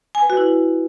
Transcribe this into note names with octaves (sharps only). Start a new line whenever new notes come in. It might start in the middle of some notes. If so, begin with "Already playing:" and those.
G#5
B4
F#4
E4